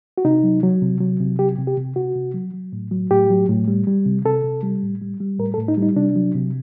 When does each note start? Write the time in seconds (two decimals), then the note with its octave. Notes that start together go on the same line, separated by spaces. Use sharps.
0.18 F#4
0.25 C3 D#4
0.44 F#3
0.63 F#3
0.82 C3
1.01 F#3
1.20 C3
1.39 F#3 G4
1.59 C3
1.67 G4
1.77 C3
1.96 C3 F#4
2.15 C3
2.34 F#3
2.53 F#3
2.73 A2
2.92 F#3
3.10 A2 G4
3.30 F#3
3.49 A2
3.68 G3
3.87 G3
4.06 C3
4.25 C3 A4
4.44 C3
4.63 G3
4.82 A2
5.01 G3
5.20 G3
5.39 A2 A#4
5.54 A4
5.58 A2
5.68 D#4
5.77 G3
5.83 D#4
5.96 C3 D4
6.16 F#3
6.35 C3